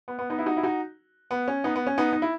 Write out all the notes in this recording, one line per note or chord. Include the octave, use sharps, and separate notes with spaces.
B3
B3
B3 D#4
E4
D#4 F#4
E4
D#4 F#4
B3
C#4
B3 D#4
B3
C#4
B3 D#4
D#4
E4